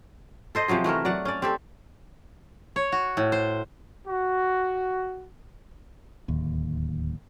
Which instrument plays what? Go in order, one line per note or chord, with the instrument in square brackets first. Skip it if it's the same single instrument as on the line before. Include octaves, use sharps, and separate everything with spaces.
[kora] A4 C5 D#5
C3 F3 F#3 G#4
E3 A3 F#4 A#4
F#3 D5 F#5
C#4 D5
C4 G4 A4
[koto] C#5
F#4
A2
C5
[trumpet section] F#4
[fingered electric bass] D1 D#2